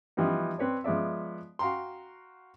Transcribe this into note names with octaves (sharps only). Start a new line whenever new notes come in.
E3 F3 G3 B3 D#4
C4 B4 C#5 D5
F3 G#3 B3 D5 E5
F#4 F5 G5 A#5 C6